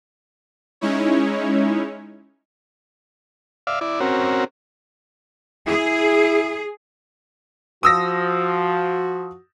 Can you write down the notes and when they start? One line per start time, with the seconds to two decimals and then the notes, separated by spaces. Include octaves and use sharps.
0.81 G#3 C#4 D#4 E4 C#5
3.67 D5 E5 F5
3.81 E4 D5
4.00 C4 C#4 F#4 A#4
5.68 E4 G#4
7.83 F3 F#4 D#6 E6 A#6